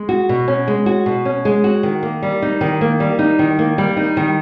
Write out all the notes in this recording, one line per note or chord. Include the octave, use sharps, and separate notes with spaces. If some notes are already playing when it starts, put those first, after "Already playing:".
Already playing: G#3
F#4
B2
C#4
G#3
F#4
B2
C#4
G#3
F#4
D#3
A#3
G3
D#4
D#3
A#3
G3
D#4
D#3
A#3
G3
D#4
D#3